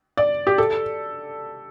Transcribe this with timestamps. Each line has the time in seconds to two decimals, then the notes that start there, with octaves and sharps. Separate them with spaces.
0.17 D5
0.47 G4
0.58 A4